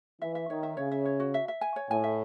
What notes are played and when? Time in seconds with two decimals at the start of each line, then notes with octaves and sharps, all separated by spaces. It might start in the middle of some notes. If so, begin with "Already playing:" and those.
0.21 E3 E5
0.35 E5
0.49 D#3 C#5
0.63 E5
0.77 C#3 C#5
0.91 E5
1.05 C#5
1.20 F#4
1.34 E5
1.48 E5
1.61 G#5
1.76 C#5
1.90 A2 G#5
2.04 E5